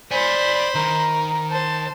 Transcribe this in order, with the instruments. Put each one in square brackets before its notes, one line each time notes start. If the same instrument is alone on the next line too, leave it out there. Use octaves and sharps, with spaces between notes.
[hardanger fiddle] C5 B5 [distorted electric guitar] D5 G#5 [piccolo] B6
[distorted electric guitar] D#3 [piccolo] A#5
[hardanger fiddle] C5 [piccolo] A5